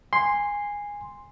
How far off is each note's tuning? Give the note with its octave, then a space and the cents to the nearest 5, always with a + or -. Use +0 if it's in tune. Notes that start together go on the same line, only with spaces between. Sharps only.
G#5 -15 C6 +0